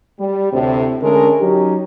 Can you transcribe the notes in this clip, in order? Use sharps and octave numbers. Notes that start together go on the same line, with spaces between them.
G3
D2 A2 C3
D3 G#3 A3 C#4 D4 A#4
F#3 C#4 D#4 G4